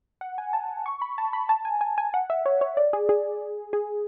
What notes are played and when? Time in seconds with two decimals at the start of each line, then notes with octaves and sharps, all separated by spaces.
0.21 F#5
0.38 G#5
0.53 A5
0.86 C#6
1.02 B5
1.18 A5
1.33 B5
1.49 A5
1.65 G#5
1.81 G#5
1.98 G#5
2.14 F#5
2.30 E5
2.46 C#5
2.61 C#5
2.77 D5
2.93 G#4
3.09 G#4
3.73 G#4